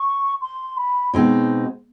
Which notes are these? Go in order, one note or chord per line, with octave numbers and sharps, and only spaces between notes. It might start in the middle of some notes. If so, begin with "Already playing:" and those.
Already playing: C#6
C6
B5
B2 G#3 C4 D#4 F#4